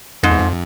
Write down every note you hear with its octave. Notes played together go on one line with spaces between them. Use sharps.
F2 G#2
E2
F2